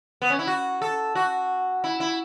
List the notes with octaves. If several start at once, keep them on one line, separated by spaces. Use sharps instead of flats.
B3
C#4
E4
F#4
A4
F#4
E4
E4